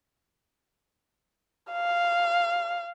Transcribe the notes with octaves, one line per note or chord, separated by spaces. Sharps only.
F5